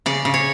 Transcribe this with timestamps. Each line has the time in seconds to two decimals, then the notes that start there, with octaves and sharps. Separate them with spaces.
0.06 C#3 D5
0.25 C#3
0.34 C#5